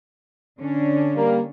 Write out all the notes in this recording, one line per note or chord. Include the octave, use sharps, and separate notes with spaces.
D3 C#4 D4
G3 A#3